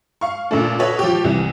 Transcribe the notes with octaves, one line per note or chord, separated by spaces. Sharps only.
F5 C#6
A#2 C#3 A3 D4
F#4 A4 B4 C#5 D#5
F3 G4
C2 E3